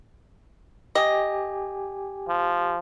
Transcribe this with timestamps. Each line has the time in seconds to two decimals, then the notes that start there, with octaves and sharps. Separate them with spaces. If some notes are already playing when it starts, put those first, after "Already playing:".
0.95 G4 D#5 G#5
2.28 F3